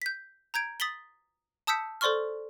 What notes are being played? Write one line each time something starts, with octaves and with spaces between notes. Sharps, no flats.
G6 B6
A#5 G6 G#6 D7
D#6 A6 B6 F#7 G7
A5 D#6 E6 G6 B6 C#7
A4 C5 D5 C6 C#6 F6